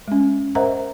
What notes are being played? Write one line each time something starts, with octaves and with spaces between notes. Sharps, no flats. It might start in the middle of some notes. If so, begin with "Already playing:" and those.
G#3 C#4
A#4 C5 D#5 E5 F#5 A#5